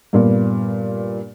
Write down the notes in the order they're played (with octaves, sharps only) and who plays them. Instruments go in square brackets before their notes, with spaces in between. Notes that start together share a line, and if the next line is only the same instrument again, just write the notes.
[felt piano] G2 A#2 B3